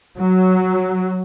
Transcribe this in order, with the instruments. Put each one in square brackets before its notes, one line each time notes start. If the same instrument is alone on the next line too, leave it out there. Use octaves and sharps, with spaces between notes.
[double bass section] F#3